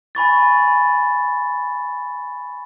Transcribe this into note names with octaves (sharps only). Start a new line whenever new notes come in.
G#5 B5 C#6 A6